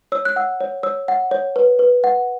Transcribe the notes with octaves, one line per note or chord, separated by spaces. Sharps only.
C#5 E6
F#6
F#5 E6
C#5
C#5 E6
F#5
C#5
B4
B4
F#5